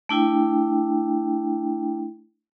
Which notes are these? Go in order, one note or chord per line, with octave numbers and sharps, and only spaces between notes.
A3 D4 E4 G5